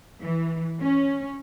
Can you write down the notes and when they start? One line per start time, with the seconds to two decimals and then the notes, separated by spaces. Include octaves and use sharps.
0.21 E3
0.81 C#4